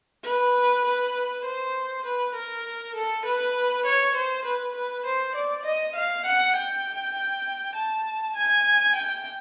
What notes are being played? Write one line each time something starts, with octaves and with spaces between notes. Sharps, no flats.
B4
B4
C5
B4
A#4
A4
B4
C#5
C5
B4
B4
C5
D5
D#5
F5
F#5
G5
A5
G#5
G5